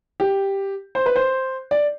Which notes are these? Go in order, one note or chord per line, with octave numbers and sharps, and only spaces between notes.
G4
C5
B4
C5
D5